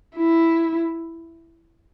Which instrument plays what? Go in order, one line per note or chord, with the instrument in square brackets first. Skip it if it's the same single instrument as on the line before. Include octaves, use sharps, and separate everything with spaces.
[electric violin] E4